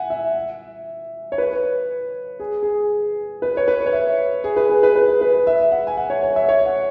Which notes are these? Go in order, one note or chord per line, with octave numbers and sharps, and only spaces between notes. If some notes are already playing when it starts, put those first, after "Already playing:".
Already playing: E5 F#5 G#5
E5
C#5
B4
G#4
G#4
B4
C#5
B4
C#5
E5
G#4
B4
G#4
B4
B4
B4
E5
F#5
G#5
F#5
C#5
C#5
E5
C#5
F#5